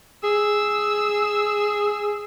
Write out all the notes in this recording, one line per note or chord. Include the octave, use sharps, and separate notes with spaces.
G#4 E6